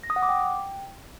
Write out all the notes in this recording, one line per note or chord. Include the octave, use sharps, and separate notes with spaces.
A#6
D#6
F#5
D6
G5